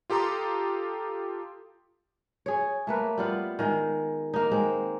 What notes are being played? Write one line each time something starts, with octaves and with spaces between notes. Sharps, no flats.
F4 G4 A4 A#5 C6 D#6
G#4 C#5
A3 A#3 B4
G3 B3 F4
D#3 G#3
A#3 D#4
G#3 C4